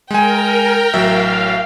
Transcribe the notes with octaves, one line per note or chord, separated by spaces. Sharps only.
G#3 A#4 G5 G#5
A1 F#3 E5 F5